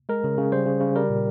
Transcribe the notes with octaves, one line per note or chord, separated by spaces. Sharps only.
G#3 A#4
C#3
C#3
G3 C5
C#3
C#3
G3 A#4
A#2